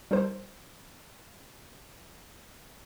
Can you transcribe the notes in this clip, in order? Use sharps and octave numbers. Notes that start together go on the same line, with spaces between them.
G3 D#4 A4 A#4 C5